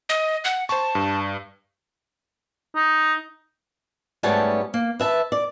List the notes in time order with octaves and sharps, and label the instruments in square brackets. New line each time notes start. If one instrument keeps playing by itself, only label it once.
[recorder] D#5
F#5
[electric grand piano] C5 C#6 [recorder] A5
[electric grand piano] G2
[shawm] D#4
[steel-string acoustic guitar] G#2 G3 A3 B3 C#4 A5
A#3
B4 E5 A5
D5